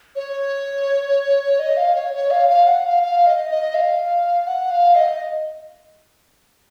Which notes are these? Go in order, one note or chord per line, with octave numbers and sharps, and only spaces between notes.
C#5
D#5
F5
C#5
C#5
F5
F5
F#5
F5
F5
D#5
D#5
F5
F#5
F5
D#5